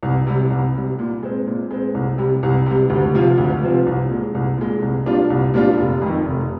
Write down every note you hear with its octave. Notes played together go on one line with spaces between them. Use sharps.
C2
C3 G3
C2
C3 G3
A#2
G#3 C4
A#2
G#3 C4
C2
C3 G3
C2
C3 G3
D2
C3 F3 C4 F4
D2
C3 F3 C4 F4
C2
A#2 G#3
C2
A#2 G#3
C2
A#2 G3 D4 F4
C2
A#2 G3 D4 F4
F1
F2 D#3
F1